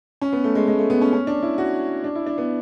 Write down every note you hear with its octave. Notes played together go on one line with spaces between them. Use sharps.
C#4
B3
A3
G#3
G#3
A3
B3
C#4
C#4
D4
E4
F#4
D4
E4
D4
B3